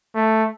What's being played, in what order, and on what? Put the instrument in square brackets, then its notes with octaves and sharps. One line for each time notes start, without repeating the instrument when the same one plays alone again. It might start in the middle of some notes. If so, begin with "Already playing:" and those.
[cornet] A3